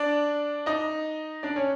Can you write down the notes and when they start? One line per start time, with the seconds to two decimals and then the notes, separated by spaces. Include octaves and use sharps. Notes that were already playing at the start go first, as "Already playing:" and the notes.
Already playing: D4 D5
0.66 D#4 D#5
1.43 D4 D5
1.56 C#4 C#5